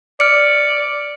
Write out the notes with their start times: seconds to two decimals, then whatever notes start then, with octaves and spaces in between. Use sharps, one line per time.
0.20 D5 F6 C#7